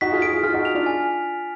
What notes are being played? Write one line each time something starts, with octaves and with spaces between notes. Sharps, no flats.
D#4 F#4 B6
F4 G#4
F4 G#4 D7
F4 G#4
F4 G#4 F6
D#4 F#4
F7
D4 F4
G#5